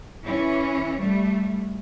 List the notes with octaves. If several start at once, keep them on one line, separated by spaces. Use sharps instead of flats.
E3 C#4
G3 A3